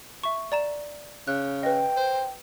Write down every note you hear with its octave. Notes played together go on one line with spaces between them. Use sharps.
E5 C#6
D5 A#5 E7
C#3 F#6
B4 D#5 G5
C5